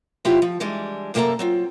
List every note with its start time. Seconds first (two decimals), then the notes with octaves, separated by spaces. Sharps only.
0.25 C3 F#3 C4 E4 F4 G4
0.42 F3
0.60 E3 G3 G#3 D4
1.14 F#2 C3 A#3 G4 A4 A#5
1.39 F#3 C4 F4